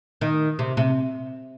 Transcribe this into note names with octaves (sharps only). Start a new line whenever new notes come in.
D#3
C3
C3